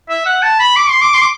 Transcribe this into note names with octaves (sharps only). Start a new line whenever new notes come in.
E5
F#5
A5
B5
D6
C6
D6
C6
D6